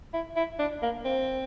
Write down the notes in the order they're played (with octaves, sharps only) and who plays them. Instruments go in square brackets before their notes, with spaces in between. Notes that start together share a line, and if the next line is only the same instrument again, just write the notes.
[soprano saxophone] E4
E4
D4
A#3
C4